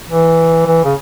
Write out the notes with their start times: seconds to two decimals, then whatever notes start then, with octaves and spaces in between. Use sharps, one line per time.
0.10 E3
0.66 E3
0.85 C#3